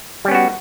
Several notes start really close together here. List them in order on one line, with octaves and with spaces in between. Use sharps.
G3 C#4 B3 F#4